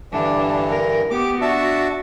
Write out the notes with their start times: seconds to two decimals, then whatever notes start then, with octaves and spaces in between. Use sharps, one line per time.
0.12 G2 D3 E3 D4
0.69 A#4
1.11 B3 G4 D6
1.41 D4 F#4 E5 A5